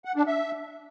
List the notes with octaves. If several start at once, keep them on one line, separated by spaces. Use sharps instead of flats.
F#5
D4
E5